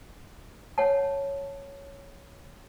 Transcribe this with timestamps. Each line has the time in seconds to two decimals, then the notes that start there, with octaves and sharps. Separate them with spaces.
0.78 C#5 F#5 A5